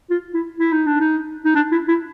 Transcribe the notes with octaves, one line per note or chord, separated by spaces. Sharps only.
F4
E4
E4
D#4
D4
D#4
D#4
D4
E4
E4